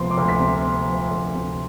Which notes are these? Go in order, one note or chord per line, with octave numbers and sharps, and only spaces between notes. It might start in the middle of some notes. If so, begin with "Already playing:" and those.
Already playing: D2 C3 F3 B3 C6
D6
D2
B6
C3
B3
F3
D2
C3